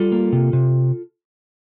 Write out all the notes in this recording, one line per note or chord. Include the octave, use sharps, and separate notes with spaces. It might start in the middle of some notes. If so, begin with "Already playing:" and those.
Already playing: G3 F4 A4
A#3
C3
C3